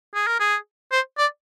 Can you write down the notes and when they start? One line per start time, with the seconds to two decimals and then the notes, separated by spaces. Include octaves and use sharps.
0.15 G#4
0.27 A#4
0.40 G#4
0.92 C5
1.18 D5